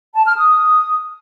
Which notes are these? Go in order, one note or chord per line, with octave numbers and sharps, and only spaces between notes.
A5
F6
D#6